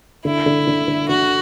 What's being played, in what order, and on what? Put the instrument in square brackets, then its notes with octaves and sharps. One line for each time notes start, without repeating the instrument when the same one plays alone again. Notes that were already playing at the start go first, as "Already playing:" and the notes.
[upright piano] D3 [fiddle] E4
[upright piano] D3
D3
D3
[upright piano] D3 [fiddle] F#4